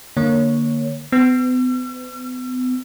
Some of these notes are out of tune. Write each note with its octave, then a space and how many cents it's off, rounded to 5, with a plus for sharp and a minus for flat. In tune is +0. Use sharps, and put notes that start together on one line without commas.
D3 +10 A#3 +0 C#5 +0
B3 +40 E6 +45